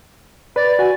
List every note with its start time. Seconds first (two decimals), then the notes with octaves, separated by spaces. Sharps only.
0.56 B4 D5
0.79 F#4 G#5